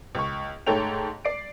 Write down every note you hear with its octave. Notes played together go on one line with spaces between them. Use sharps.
C#2 C#6
G#2 A3 A4 C#5 G5 F7
D5 C7 D7